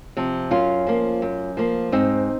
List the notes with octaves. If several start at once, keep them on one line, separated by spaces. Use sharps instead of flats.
C3 F3
F#2 C#4 F4
F3 A#3
F#2
F3 A#3
G#2 C4 D#4